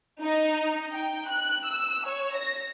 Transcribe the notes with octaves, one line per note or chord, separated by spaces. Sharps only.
D#4
G5
F#6
E6
C#5
A#6